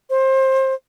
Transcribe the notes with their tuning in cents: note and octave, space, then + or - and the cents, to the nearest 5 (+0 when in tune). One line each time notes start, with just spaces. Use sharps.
C5 +25